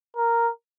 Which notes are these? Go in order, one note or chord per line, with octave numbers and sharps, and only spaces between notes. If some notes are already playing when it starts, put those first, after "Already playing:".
A#4